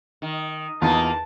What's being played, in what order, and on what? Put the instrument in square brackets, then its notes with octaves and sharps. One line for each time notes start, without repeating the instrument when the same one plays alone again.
[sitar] D#3
[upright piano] E2 [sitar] A#3 D#4 F4 [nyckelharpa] A5